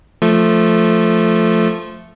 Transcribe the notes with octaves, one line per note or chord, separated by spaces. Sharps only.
F3 A3